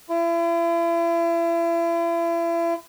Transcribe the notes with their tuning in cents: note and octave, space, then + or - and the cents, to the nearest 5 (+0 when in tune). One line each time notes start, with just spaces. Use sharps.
E4 +40